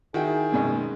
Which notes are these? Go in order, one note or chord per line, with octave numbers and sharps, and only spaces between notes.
D#3 E4 F#4 G#4 G5
F#2 B2 G#3